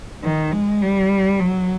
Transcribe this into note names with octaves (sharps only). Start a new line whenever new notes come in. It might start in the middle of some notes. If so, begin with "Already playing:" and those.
D#3
G#3
G3
F#3